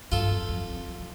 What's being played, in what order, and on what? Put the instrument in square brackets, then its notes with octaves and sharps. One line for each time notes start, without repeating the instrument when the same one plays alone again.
[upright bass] G2 [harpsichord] F4 A4
[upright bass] F2
F2
D3
F3
F3